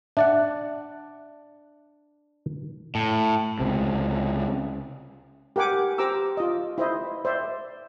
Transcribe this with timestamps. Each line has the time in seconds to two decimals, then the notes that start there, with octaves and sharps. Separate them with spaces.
0.17 D4 D5 E5 F#5
2.95 A2
3.60 C#2 C3
5.56 G4 A#4 F#5 G#5 D6
5.98 G4 C5 A#5 D6 E6
6.37 F4 D#5
6.78 E4 C5 D#5
7.25 C5 D5 E5